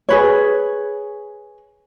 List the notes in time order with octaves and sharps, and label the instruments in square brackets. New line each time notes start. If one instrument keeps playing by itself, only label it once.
[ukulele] G#4 B4 C#5